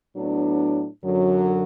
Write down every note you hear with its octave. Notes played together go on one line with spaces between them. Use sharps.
A2 F#3 B3 D4
F#2 D3 F#3